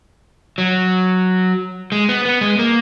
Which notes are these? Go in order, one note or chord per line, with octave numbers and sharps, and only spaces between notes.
F#3
G#3
B3
B3
G#3
A#3